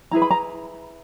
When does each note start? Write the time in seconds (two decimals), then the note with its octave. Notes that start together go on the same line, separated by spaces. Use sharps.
0.11 E4 G#4 B4 A#5
0.22 B5
0.31 A#5